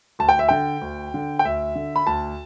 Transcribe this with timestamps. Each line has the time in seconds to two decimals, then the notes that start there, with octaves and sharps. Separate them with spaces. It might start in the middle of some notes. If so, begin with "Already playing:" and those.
0.19 D2 A5
0.29 G5
0.39 E5
0.49 D3 G5
0.82 D2
1.14 D3
1.39 G5
1.45 D2 E5
1.75 D3
1.96 B5
2.07 D2 A5